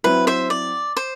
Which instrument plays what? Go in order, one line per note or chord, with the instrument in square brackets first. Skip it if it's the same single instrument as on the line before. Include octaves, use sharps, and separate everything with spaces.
[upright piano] F#3 C4 E4 [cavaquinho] B4
[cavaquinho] C5 E5
D5
C5